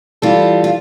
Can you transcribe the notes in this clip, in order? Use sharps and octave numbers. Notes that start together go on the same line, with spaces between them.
E3 G3 F4 A4
F4